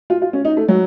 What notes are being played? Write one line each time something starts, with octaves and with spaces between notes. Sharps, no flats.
F4
F4
C#4
D#4
A3
F#3